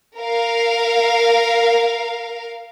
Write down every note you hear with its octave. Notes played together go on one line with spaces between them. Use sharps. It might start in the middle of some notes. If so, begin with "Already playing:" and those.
A#4 F5